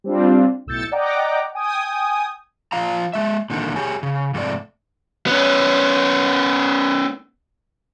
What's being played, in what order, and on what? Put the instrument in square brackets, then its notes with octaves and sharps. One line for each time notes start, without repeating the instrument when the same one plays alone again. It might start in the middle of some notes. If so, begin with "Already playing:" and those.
[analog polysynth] G3 C4 D4 F4
B1 A2 E6 G6 A6 C#7
D5 D#5 F#5 G5 A#5 D6
G5 G#5 D#6
[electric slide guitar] F3 F4 F5 A#5
G#3 E5
A#2 D3 D#3
G4 G#4 C#5 G#5
C#3
F2 G#2 C3 A3 D5
[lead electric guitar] B3 C#4